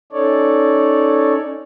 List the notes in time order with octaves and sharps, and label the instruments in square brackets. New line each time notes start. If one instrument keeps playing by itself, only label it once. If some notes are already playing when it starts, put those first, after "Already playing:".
[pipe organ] C#4 D#4 A4 C#5 D5